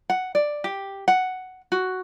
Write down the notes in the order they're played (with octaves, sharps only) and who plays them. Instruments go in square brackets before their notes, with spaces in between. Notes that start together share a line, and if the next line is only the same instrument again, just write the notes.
[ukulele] F#5
D5
G4
F#5
F#4